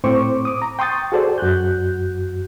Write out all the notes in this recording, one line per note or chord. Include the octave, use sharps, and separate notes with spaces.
A2 C4 C5 C#6 D6
D6 D#6
A#5
G5 C6 C#6 D#6 G6 A6
F#4 G#4 A4 C5 D5
F#2 F#4 F#6 G6